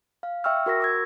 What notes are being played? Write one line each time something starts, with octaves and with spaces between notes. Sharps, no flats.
F5
E5 G5 C#6 E6 F6
F#4 A#4 C#6 A#6
D6 E6 G#6